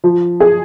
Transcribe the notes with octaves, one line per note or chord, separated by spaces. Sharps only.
F3
G#4